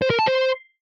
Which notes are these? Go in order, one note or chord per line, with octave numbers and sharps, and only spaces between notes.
C5
A#4
A5
C5